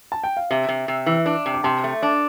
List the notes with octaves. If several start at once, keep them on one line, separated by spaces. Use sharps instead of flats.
A5
G5
F5
C3 E5
C3
C3
E3
D4
C3
D6
C3 A5 C6
A3
D4